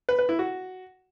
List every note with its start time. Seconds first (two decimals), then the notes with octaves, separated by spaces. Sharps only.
0.09 B4
0.19 B4
0.29 E4
0.39 F#4